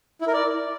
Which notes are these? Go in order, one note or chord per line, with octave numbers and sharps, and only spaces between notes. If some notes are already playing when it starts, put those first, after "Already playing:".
E4
A#4
D5